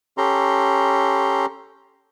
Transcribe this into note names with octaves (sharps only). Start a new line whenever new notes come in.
C#4 G4 A4 A#5 C6